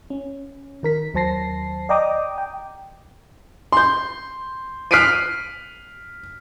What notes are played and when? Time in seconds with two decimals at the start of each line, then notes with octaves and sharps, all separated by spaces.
0.10 C#4
0.83 D#3 A#4 B6
1.14 D#2 F#3 C5 A5 A#6 C7
1.89 D5 D#5 G5 A#5 D6 D#6
2.38 G5
3.72 C6 G6
4.91 F6 F#6 B6 C7 D7 D#7